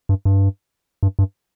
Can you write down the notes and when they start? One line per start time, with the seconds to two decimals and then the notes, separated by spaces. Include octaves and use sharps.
0.09 G2
0.25 G2
1.03 G2
1.19 G2